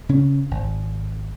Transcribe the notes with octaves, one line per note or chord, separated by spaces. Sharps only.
C#3 C#4
G#1